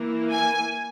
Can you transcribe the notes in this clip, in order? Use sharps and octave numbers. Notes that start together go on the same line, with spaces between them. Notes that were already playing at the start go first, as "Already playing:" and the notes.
Already playing: E3 A#3 E4
G#5